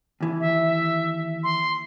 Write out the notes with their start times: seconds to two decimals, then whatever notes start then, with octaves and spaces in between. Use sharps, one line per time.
0.20 D#2 E3
0.40 E5
1.44 C6